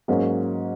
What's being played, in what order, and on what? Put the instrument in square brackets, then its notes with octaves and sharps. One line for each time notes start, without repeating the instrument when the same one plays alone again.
[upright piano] G#2 F#3 A#3 C#4